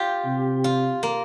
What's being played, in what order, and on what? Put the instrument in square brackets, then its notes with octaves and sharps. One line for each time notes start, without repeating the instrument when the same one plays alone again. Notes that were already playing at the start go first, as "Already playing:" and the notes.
Already playing: [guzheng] F4 G4
[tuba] C3
[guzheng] F4
A#3